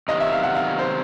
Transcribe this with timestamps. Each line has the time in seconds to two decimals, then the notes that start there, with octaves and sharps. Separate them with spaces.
0.08 C3 D#3 F#3 B3 D#5
0.20 E5
0.32 F5
0.43 F#5
0.55 F5
0.79 C5